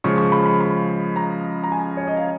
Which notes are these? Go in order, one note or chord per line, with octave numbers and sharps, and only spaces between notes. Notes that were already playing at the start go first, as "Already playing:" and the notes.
C#3 F3 G#3 C#6
C#6
B5
B5
B5
A#5
A#5
G#5
C#5
D#5
F5